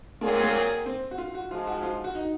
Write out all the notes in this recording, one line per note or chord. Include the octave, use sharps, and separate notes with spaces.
A#2 F#3 A#3 C4 F4 G#4
G#3
A#3
C4
F#4
F4
F#4
G#2 F3 G#3 F4
F#4
F4
F#4
D#4